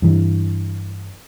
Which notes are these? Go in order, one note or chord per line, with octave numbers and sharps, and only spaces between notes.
G2 E3